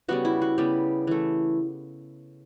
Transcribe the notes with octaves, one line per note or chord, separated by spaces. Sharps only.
C#3 G3 B3 F#4
E4
F#4
C#3 G3 B3 G4
E3 A3